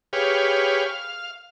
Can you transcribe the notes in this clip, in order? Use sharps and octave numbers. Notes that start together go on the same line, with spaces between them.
G4 G#4 B4 C#5 F5
F5